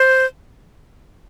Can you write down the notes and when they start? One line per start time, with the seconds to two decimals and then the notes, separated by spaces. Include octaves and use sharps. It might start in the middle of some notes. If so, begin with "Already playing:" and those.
Already playing: C5